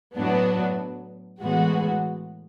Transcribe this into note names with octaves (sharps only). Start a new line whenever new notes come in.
A2 F#3 B3 D4 F#4
A2 E3 G#3 B3 F#4